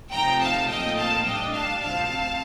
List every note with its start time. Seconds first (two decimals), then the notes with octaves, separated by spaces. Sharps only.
0.13 C3 F3 A3 D#4 G5 A#5
0.41 F5 A5
0.69 A#2 F3 A3 C4 D#4 D#5 G5
0.97 F5 A5
1.25 A2 G3 D4 D#5 G5
1.53 F5 A5
1.81 D2 C3 F3 C4 F5 A5